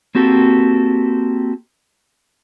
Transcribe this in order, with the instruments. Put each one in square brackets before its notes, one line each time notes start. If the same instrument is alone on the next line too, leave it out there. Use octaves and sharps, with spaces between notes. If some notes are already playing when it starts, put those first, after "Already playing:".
[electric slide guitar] A#3 C4 F#4 G4 A4